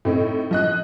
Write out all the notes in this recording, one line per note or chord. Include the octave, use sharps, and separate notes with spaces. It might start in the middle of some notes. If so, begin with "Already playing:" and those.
A2 C4 D#4
F3 D#5 F#6